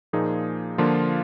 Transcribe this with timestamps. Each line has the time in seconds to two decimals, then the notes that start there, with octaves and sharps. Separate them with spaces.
0.13 A#2 F3 A#3 D#4 G#4
0.78 D3 F3 A#3 F4